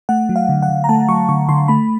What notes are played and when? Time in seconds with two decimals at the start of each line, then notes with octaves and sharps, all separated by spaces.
0.09 A3 F#5
0.29 F#3
0.36 F5
0.49 D3
0.62 F#5
0.69 D3
0.84 A#5
0.89 A3 A5
1.09 F#3 C#6
1.29 D3 C#6
1.49 D3 C6
1.68 A3 B5